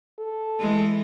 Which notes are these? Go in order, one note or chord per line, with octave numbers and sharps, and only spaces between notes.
A4
E3 G#3